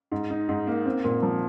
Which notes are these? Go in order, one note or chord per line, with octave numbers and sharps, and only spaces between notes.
G#2
D#4
G#2
A#3
C4
A#2
F3